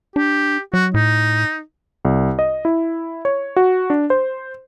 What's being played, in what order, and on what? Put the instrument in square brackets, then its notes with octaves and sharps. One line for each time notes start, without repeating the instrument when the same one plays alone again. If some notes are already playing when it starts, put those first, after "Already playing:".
[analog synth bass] D4 [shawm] G4
[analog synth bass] F#3 [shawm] F#4
[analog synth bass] A2 [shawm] D#4
[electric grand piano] C2
D#5
E4
C#5
F#4
D4
C5